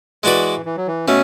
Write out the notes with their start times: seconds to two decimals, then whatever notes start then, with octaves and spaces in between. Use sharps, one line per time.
0.23 E3 G#3 D4 F#4 B4 D5
0.66 E3
0.77 F#3
0.87 E3
1.07 B2 A3 C#4